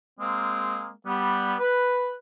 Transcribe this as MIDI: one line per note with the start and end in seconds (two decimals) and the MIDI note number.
0.20 0.91 56
0.20 0.91 58
0.20 0.91 60
1.06 1.54 55
1.06 1.54 59
1.59 2.14 71